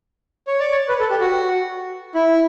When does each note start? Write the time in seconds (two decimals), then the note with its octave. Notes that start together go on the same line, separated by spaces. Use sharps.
0.47 C#5
0.60 D5
0.72 C#5
0.89 B4
1.00 A4
1.10 G4
1.20 F#4
2.15 E4